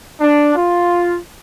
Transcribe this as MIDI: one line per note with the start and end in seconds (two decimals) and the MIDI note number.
0.20 0.54 62
0.55 1.17 65